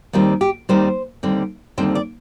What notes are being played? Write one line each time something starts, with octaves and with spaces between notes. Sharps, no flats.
D#2 D#3 G3 C4 F4
G4
D#2 D#3 G3 C4 C5
D#2 D3 G3 C4
D#2 D3 G3 C4 C5
D5